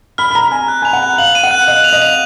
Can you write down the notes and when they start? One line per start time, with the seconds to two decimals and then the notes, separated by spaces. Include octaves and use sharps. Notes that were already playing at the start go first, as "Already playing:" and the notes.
0.18 B5 F6
0.31 B5
0.35 A#5 F6
0.51 G#5 F6
0.68 F#6
0.82 G#5 F7
0.93 F#5
1.02 F#6
1.18 F5 F#7
1.35 D#7
1.43 F#5
1.51 F#6
1.67 D#5 F#6
1.84 F7
1.93 D#5
2.02 F7